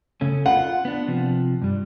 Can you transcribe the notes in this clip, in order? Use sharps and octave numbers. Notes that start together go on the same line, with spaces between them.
C#3 A3 C#4
F4 F#5
B3 D4
C3 F3
G2 G3